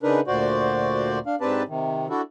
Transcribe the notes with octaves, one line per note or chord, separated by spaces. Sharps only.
C#3 D4 D#4 A#4 B4
D2 A#2 F#4 C5 D5
D4 F5
G#2 C4 D4 G4 B4 A5
C3 D#3
D4 E4 F#4 A4